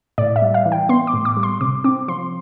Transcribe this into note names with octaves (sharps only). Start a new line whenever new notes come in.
A2 D5
E5
G3
F5
E3
G5
B3 C6
D6
A2
D6
G3
C6
C3 D6
C4 D6
F3 C6